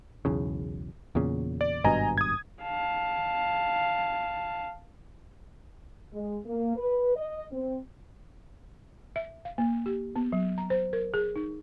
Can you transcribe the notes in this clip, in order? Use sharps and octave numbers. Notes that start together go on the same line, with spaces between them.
B1 E2 C#3
E2 A#2 C#3
D5
G#1 G2 B2 D#5 G#5 A#5
D#6 G#6
F5 A5
G#3
A#3
B4
D#5
C4
E5
F5
A#3
G4
B3
F#3
A#5
C5
A#4
G#4
D#4